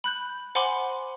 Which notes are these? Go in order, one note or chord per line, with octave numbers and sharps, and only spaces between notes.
B5 F#6 G6
C5 F#5 G#5 B5 C6 D6